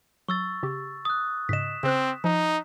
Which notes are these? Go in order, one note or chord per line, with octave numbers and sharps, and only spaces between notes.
F#3 C#6 E6 A6
C#3 G4
D#6 F#6
G#2 C#3 D#5 B6 E7
C#3 C4 C5 F#6
F3 D#4